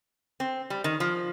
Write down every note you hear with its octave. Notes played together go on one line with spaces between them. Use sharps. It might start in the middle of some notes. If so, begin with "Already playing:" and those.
C4
G3
D#3
F3